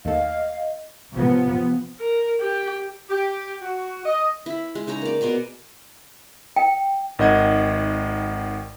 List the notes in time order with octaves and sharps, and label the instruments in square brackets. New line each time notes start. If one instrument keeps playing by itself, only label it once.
[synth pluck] D#2 A3 [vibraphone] D#5 [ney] F5
[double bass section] C3 F3 B3
[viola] A#4
G4
[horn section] G4
F#4
D#5
[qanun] E4 B5
G#3
C#3 D#4 C#5 A#5
A#3 D5
B2 B3 G#4 A#5
[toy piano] G5
[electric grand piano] G#1 D#3 D#5 F#5 G#6